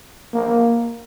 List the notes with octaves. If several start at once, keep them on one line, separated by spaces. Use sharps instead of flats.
A#3